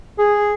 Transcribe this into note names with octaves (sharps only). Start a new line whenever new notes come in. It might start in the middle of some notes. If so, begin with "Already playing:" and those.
G#4